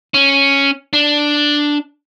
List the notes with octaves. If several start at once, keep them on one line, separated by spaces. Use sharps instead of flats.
C#4
D4